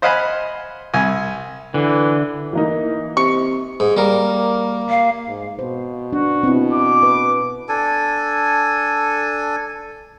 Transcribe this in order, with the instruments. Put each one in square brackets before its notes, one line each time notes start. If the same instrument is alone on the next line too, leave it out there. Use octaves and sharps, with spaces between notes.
[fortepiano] C5 D#5 F5 F#5 G#5 B5
C2 G#5
[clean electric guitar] D3 [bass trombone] E3
[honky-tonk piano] E3 A#3 D#4
[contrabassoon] C3 [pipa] C#6
[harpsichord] G#2
[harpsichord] G3 A#4 [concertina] A#3
[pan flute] F5
[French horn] G#2
[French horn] B2 [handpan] C5
[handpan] D4 [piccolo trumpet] F#4
[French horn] B2 [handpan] C4 E4
[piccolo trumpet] D6
[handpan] B4
[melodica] D4 A4 G#5